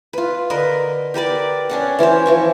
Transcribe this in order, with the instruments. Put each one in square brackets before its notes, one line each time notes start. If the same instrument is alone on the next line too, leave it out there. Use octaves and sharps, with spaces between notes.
[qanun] F4 B4
D3 A#4 B4 D#5
G4 A#4 B4 D5
C#4 D4 F#5
E3 C#4 F#4 C5
E3 F3 C#6